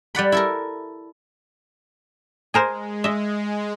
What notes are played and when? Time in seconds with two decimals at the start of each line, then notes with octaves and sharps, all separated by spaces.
0.15 G3 D5 F#5 B5
0.32 E4 A4 A#4
2.54 G#3 G#4 A#4 C5
3.04 D#5 E5